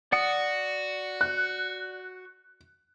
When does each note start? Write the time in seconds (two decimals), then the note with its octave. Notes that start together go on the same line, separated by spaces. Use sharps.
0.12 F#4 D5 F#5 D#6
1.21 F#6